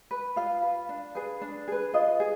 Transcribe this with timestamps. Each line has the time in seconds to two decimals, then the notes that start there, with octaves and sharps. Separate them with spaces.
0.11 B4
0.36 F4 F5
0.62 B4
0.89 D4
1.15 G#4 B4
1.41 D4
1.68 G#4 B4
1.93 F4 D#5
2.20 G#4